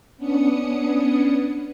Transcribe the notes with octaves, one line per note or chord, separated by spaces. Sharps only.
B3 C#4 D4 D#6 C#7